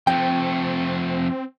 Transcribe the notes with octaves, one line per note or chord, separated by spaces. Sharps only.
F2 A3 C4 G5